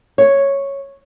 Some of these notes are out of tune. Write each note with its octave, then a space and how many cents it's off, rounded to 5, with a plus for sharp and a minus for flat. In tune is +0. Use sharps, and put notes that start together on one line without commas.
C#5 -5